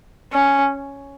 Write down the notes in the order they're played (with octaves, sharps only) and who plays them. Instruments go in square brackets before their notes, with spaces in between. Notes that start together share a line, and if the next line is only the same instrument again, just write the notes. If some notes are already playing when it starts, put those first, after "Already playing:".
[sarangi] C#4